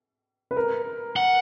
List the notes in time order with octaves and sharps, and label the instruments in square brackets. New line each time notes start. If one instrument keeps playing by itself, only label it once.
[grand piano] B4
A#4
[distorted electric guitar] F#5